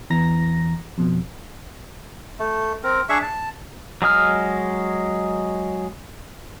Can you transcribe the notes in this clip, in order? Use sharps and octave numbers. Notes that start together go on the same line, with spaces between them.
E2 E3 A#5 A#6
F2 B2
A3
C4 A#4
D4 G#4 E5 C#6
A5
F#3 G#3 D#6 F6